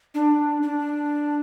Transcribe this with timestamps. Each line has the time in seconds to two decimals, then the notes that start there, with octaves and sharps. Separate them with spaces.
0.14 D4
0.62 D4